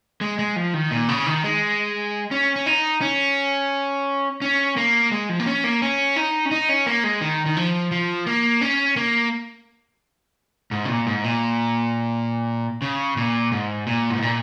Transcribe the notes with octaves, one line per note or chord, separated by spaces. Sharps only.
G#3
G#3
F3
D#3
A#2
C#3
D#3
G#3
C#4
C#4
D#4
C#4
C#4
A#3
G#3
F3
A#3
C#4
A#3
C#4
D#4
C#4
D#4
C#4
A#3
G#3
D#3
D#3
F3
F3
A#3
C#4
A#3
G#2
C#3
A#2
G#2
A#2
C#3
A#2
G#2
A#2
G#2
A#2